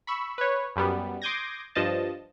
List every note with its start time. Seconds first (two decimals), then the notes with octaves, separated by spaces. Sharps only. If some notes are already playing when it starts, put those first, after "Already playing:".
0.07 B5 C#6 E6
0.38 B4 C#5
0.76 F#2 G3 B3
1.22 C6 D6 D#6 G6 G#6 A#6
1.75 G2 F3 D#5 A5